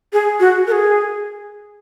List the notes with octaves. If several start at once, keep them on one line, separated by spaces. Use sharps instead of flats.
G#4
F#4
A#4
G#4